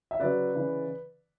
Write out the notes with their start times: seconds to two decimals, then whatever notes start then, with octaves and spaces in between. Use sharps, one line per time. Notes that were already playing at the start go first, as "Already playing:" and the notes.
0.11 E5
0.20 C#3 F#3 B4 D5
0.55 C#3 E3